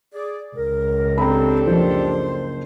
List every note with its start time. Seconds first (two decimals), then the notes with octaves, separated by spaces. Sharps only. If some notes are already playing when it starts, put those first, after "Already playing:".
0.14 G#4 D5
0.57 C#2 A#4
1.18 C4 D4 G4 A4 A#5 B5
1.67 F#1 F3 C5